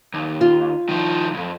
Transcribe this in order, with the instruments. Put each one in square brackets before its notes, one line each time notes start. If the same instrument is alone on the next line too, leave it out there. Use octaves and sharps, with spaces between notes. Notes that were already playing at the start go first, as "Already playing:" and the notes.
[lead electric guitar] D#2
[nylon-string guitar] F4
[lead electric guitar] D#3 F3
C2 F2